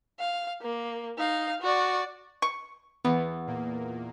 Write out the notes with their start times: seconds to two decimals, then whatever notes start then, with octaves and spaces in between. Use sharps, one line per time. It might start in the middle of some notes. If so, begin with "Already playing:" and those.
0.19 F5
0.62 A#3
1.18 D#4 F5
1.62 F#4 D5
2.42 C#6
3.05 E2 B3
3.47 A#2 A#3